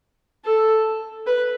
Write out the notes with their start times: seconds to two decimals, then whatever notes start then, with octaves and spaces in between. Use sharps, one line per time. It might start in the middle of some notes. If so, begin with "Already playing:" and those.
0.45 A4
1.27 B4